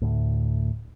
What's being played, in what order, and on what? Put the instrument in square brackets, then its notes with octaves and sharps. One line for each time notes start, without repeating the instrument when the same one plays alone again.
[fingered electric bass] D2 A2